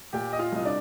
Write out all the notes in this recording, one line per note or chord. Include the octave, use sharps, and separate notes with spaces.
A#2 G4 G5
D#5
F4 F5
C2 D#5
D4 D5